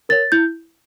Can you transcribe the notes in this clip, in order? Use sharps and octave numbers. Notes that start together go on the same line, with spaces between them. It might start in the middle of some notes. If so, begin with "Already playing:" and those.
A#4 C#5 A6
E4 G6